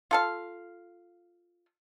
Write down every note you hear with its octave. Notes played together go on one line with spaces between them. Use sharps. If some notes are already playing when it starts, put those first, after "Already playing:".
F4 A4 F5